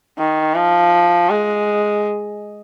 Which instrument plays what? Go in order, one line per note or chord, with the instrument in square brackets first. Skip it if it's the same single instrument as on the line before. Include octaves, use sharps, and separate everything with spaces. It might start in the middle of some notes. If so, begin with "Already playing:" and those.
[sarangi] D#3
F3
G#3